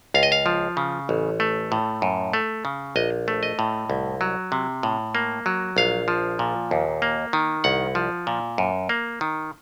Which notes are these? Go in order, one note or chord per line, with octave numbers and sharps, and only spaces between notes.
C#2 F5
D#5
F5
F3
C#3
A1
A3
A2
F#2
A3
C#3
A#1 D#5
A3
D#5
A2
C2
F#3
C3
A2
A#3
F#3
A#1 F5
F3
A#2
D#2
A#3
D#3
C2 F#5
F3
A#2
F#2
A#3
D#3